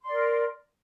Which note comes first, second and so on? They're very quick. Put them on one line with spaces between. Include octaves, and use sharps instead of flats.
C6 D5 A#4